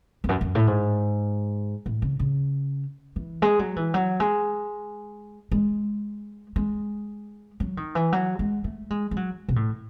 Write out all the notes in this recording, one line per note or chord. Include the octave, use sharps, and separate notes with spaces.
E2
F#2
F#2
A2
G#2
A2
C#3
C#3
E3
G#3
F#3
E3
F#3
G#3
G#3
G#3
F#3
D#3
E3
F#3
G#3
A3
G#3
G#3
F#3
B2
A2